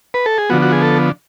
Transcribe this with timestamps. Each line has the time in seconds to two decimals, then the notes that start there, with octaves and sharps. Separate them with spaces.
0.14 B4
0.26 A4
0.38 G#4
0.50 D3 F3 B3 F#4
0.62 F#4
0.72 G#4
0.82 A4